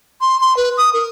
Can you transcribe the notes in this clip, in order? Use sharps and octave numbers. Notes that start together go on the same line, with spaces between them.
C6
C6
B4
D#6
A#4